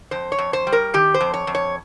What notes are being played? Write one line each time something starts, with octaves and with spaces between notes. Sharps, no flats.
F2 C5
C#5
F2
C5
G3
A#4
D#3 G4
C5
F2
C#5
F2
C#5